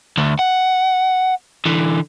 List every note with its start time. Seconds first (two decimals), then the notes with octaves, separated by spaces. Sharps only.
0.17 D2 A3
0.39 F#5
1.66 D3 E3